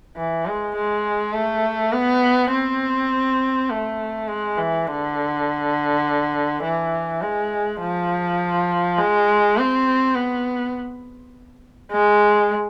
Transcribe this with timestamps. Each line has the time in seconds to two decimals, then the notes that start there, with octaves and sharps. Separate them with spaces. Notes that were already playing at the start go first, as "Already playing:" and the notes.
0.17 E3
0.46 G#3
0.76 G#3
1.34 A3
1.92 B3
2.51 C4
3.70 A3
4.28 G#3
4.57 E3
4.87 D3
6.64 E3
7.22 G#3
7.81 F3
8.98 G#3
9.58 C4
10.15 B3
11.92 G#3